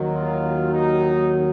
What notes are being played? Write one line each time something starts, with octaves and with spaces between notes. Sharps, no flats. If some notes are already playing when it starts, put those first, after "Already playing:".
Already playing: D#2 D#3 F#3
F4
D#4